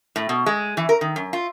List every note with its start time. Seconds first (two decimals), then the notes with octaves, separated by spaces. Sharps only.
0.16 A2
0.29 B2
0.46 G#3
0.77 E3
0.89 A#4
1.01 D#3
1.16 F#2
1.33 F4